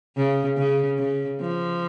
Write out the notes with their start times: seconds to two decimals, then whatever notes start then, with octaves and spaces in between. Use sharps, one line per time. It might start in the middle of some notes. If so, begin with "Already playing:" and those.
0.17 C#3
0.58 C#3
0.99 C#3
1.41 F3